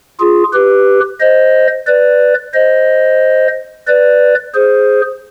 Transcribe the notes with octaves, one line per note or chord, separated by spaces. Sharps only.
F4 G#4
G4 B4
C5 D#5
B4 D5
C5 D#5
B4 D5
G#4 C5